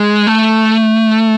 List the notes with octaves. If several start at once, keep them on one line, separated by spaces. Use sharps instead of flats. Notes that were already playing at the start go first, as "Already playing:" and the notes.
Already playing: G#3
A3